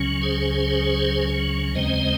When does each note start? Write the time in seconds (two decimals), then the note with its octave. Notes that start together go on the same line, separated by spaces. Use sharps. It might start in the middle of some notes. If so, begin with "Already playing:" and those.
Already playing: C#2 C#3 F#3 C#4
0.22 G#4 C5
1.75 D#2 C#3 G#3 C4 C5 D#5